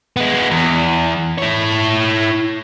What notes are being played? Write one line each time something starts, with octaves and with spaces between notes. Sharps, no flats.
G#3 B3
E2
E4 C#5